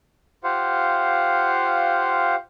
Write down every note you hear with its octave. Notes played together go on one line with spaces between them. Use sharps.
F4 G4 C5 F5 F#5